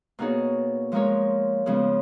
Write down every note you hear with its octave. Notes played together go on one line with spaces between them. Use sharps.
B2 A#3 D#4 G#4 C#5
F3 G#3 D#4 A#4 C#5
C#3 F3 G#3 B3